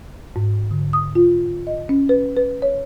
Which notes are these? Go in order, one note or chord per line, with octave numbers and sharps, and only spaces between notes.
G#2
D3
D#6
F4
D#5
C#4
B4
B4
C#5